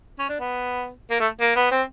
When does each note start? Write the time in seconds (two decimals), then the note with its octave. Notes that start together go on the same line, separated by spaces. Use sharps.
0.19 C#4
0.29 D4
0.39 B3
1.10 A#3
1.20 A3
1.40 A#3
1.56 B3
1.71 C4